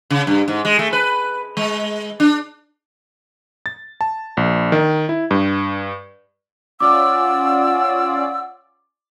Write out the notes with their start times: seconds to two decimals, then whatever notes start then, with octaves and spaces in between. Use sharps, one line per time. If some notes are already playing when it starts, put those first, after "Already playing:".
0.10 C#3
0.27 G2
0.48 G#2
0.65 G#3
0.79 A3
0.93 B4
1.57 G#3
2.20 D4
3.66 A6
4.01 A5
4.37 A#1
4.72 D#3
5.09 E4
5.31 G2
6.80 C#4 F4 D5 F#5 D6 E6